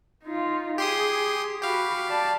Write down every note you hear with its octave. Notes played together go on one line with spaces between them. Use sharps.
D#4 F4
G4 G#4 C6 D#6
F#4 G4 F5 B5
D5 A5